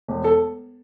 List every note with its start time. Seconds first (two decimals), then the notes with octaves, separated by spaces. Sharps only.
0.08 E1
0.24 A4